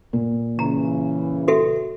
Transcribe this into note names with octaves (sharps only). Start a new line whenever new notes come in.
A#2
C#3 E3 A#5
F#4 A4 E5